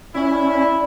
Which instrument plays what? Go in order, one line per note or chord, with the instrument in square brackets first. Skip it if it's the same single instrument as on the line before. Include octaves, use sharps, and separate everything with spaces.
[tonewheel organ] C#4 [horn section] E4 [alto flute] D5